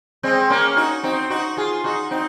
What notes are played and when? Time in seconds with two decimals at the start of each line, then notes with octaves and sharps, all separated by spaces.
0.23 G#3 C4
0.50 A#3 C#4
0.77 D#4 F#4
1.03 C4 D#4
1.30 D#4 F#4
1.57 F4 G#4
1.84 D#4 F#4
2.11 C4 D#4